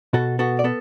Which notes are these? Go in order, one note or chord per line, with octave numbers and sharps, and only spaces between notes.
B2 F#4 A4
B3 F#4 A4
D5
B3 A4